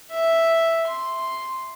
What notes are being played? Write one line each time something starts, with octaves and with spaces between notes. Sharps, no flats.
E5
C6